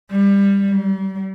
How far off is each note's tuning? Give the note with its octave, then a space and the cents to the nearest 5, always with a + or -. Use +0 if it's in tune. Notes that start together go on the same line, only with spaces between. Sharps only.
G3 +20
G3 -40